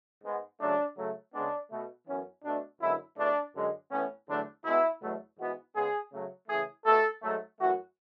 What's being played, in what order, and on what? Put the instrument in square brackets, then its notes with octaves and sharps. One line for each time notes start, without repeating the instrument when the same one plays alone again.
[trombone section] G#2 G#3 B3
C#3 F#3 A3 D4
C#3 F#3 A3
C#3 G#3 B3 D4
B2 A3
F#2 E3 B3 C#4
B2 A3 D4
F#2 D3 G#3 B3 E4
E2 B2 A3 D4
F#2 D3 G#3
A2 E3 B3 C#4
E2 D3 F#3 A3 D4
B2 G#3 B3 E4
E2 B2 F#3 A3
G#2 E3 G#3 B3 F#4
C#3 G#3 B3 G#4
C#3 F#3 A3
C#3 E3 A3 G#4
B2 A3 A4
G#2 F#3 A3
F#2 E3 A3 F#4